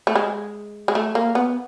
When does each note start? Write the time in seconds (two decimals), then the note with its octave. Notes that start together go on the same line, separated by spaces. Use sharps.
0.07 A3
0.15 G#3
0.88 G#3
0.95 A3
1.15 A#3
1.35 B3